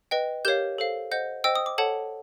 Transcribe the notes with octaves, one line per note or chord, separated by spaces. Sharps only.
B4 D#5 G5
G4 A#4 C#5 F5 G6
A4 C5 F5
C5 D#5 F#5 G6
C5 D#5 G5 E6
D#6
D6
A4 C#5 F#5 A5